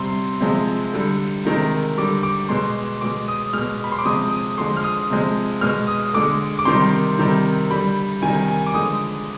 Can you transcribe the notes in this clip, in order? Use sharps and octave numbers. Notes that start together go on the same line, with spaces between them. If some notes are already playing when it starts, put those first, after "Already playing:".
Already playing: C3 G3 C6
C3 F3 G#3
D3 G3
C3 D#3 G#3
D3 G3 D6
D6
B2 G#3 C6
B2 G#3 D6
D#6
B2 G#3 F6
B5
C6
D6
C3 F3 G#3 D#6
D#6
D3 F3 G#3 C6
F6
D#6
C3 F3 G#3
B2 G#3 F6
D#6
D3 G#3 D6
D6
C3 D#3 G3 C6
C3 D#3 G3
D3 G3 B5
C3 D#3 G3 G#5
G#5
D6
D3 F3 G#3 D#6